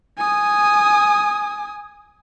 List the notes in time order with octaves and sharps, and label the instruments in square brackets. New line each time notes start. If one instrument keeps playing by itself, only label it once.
[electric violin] G#5 D#6